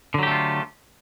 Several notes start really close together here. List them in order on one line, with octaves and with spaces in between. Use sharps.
D3 F#3 G4 A3 F4